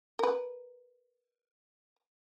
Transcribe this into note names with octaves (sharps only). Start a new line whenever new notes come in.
A#4 B4